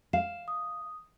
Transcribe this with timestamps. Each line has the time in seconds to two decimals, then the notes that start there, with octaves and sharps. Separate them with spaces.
0.13 F5 E7
0.48 D#6